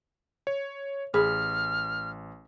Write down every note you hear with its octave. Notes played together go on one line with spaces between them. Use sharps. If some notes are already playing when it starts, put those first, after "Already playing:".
C#5
A1 G#4 B4 F6